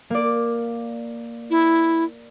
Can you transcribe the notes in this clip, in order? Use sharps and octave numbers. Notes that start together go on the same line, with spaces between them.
A#3 D5
E4